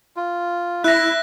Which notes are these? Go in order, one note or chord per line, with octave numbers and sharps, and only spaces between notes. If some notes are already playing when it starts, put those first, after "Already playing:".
F4
E4 E5 F#6 A#6